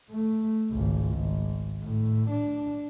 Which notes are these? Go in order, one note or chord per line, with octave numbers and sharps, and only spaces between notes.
A3
G#1 C#2
G#1
A2
D4